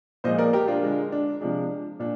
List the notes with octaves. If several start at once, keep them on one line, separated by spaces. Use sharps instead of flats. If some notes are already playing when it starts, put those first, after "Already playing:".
A#2 F3 G#3 C5 D#5
A#4 D5
G4 A#4
D4 F4
D3 G#3
D4
C3 F3 G#3 D4
A#2 D4